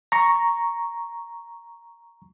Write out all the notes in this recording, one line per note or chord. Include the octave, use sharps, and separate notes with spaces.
A#5 C#6